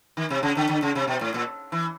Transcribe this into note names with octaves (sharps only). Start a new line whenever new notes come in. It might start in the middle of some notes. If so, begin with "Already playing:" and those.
D#3
C3
C#3
D3
D3
C#3
C3
B2
A2
A#2
E3